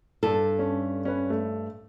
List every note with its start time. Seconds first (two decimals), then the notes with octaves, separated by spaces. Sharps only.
0.23 G2 A4
0.59 C#4
1.05 C#4 B4
1.30 A3